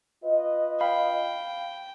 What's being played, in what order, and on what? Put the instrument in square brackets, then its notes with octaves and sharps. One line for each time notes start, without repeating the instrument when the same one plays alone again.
[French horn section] F4 B4 D#5
[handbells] F5 B5 [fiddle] G5